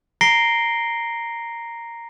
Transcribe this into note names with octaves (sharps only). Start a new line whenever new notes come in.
A#5 A#6 C7 D7 G7